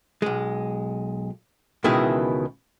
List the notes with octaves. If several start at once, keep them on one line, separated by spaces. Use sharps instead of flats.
B1 G#3
C#2 B2 D#3 E3 E4 G#4